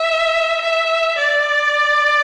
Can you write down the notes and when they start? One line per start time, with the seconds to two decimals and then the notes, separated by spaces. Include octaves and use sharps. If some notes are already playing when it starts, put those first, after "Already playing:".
Already playing: E5
0.61 E5
1.18 D5